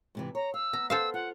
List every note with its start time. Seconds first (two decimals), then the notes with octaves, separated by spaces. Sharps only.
0.15 G#2 C3 E3
0.35 C#5 A#5
0.54 F5 E6
0.73 B3 A#5
0.90 A4 C5 F5 E6
1.14 F4 F#5